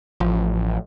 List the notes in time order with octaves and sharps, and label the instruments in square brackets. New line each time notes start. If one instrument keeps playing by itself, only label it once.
[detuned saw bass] A1 [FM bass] F3